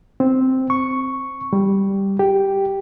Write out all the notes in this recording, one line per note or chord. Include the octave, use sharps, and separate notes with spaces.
C4
C#6
G3
G4